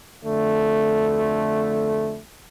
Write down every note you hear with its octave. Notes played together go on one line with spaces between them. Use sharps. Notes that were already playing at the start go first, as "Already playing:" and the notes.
F2 D3 A3